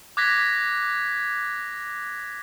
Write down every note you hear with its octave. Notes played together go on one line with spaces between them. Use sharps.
D6 F#6 G#6 A#6 B6